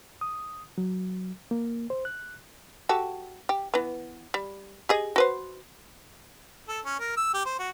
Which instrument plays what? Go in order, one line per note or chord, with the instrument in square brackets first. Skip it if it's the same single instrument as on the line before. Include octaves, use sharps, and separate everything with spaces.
[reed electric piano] D#6
F#3
A#3
C5
F#6
[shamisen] F#4 G4 A4
G4
E3 B3
G3
G4 G#4 D#5
F#4 B4 C5
[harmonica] A4
C#4
A#4
E6
G4
C5
F#4